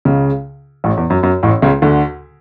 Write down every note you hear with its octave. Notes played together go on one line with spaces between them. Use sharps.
C#2 C#3
A1 A2
E2
F#2
F#2
A1 A2
C#2 C#3
D2 D3